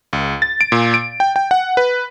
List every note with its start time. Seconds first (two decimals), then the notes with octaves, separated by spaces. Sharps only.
0.13 C#2
0.42 A6
0.61 D7
0.72 A#2
0.94 D7
1.20 G5
1.36 G5
1.51 F#5
1.77 B4